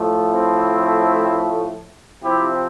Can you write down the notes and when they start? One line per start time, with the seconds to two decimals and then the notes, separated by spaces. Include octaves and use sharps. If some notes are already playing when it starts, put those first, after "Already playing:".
Already playing: A2 F3 A3
0.31 C4 E4
2.23 C3 F3 C4 E4 G4